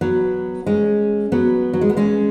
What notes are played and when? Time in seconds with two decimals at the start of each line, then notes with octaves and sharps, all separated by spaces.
0.01 F#3 B3
0.66 G#3 C#4
1.32 F#3 B3
1.73 F#3
1.81 G#3
1.89 B3
1.97 G#3 C#4